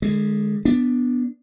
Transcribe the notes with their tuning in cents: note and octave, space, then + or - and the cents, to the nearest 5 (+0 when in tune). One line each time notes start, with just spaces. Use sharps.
D3 +30 G#3 +0
B3 +0 D4 +0